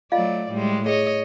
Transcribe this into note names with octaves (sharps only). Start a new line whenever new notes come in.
F#3 A3 F4 D5 D#5 F5
A2 G3 G#3
G#4 C#5 D#5